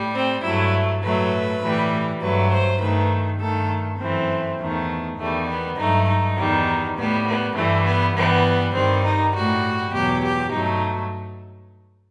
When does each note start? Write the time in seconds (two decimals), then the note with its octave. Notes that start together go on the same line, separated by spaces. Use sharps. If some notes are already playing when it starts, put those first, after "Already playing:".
Already playing: A2 G3
0.14 C4
0.43 G2 F#3 A3 E4
1.02 A2 F#3 A3 B4
1.62 A2 E3 G3
2.21 G2 F#3 A3 B4
2.51 C5
2.81 G2 D#3 A3 B4
3.40 G2 D#3 A3 A4
3.99 F#2 E3 A3 C4
4.59 E2 D#3 A3
5.18 E2 D#3 G3 A3
5.47 B3
5.77 G2 F#3 A3 D#4
6.07 D#4
6.37 E2 D#3 G3
6.96 A2 G3 B3
7.26 B3
7.55 G2 E3 G3 A3
7.85 B3
8.15 G2 E3 G3 B3
8.74 G2 D#3 G3 C4
9.03 D#4
9.34 A2 G3 F#4
9.93 E2 B2 F#3 G4
10.23 G4
10.52 G2 F#3 A3 D#4